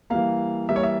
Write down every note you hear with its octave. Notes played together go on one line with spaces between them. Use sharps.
E3 G3 A#3 F5
E3 G3 A#3 E5
C#5
E5